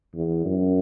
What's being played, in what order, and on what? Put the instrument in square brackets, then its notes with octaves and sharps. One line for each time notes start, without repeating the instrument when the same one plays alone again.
[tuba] E2
F#2